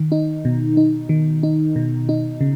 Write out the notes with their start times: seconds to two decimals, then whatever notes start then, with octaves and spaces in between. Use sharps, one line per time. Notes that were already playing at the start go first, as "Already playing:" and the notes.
Already playing: D#3
0.12 D#4
0.45 B2
0.77 D#4
1.09 D#3
1.43 D#4
1.76 B2
2.09 D#4
2.41 C#3